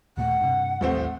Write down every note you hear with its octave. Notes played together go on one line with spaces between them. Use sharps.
D#2 A#2 A3 F#5
G2 C3
A1 D#2 F3 G3 A3 C4